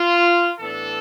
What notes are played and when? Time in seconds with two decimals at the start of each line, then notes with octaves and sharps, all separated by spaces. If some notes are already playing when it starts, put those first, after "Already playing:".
Already playing: F4
0.59 A2 E3 B3 D4 A4